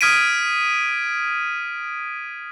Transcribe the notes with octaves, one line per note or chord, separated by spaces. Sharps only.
D#6 F6 G#6 B6 D7 D#7